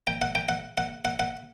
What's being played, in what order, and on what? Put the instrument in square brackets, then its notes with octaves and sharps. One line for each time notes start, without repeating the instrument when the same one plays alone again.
[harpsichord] G5
F#5
G5
F#5
F#5
F#5
F#5